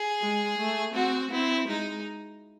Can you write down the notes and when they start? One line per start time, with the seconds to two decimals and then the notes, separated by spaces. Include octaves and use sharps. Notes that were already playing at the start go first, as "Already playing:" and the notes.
Already playing: G#4
0.22 G#3
0.58 A3
0.95 C4 F#4
1.32 C4 E4
1.69 G#3 D#4